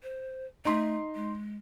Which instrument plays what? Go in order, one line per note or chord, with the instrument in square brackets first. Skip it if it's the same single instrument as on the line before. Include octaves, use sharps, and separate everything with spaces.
[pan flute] C5
[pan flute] A3 [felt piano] D#4 C6
[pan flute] G#3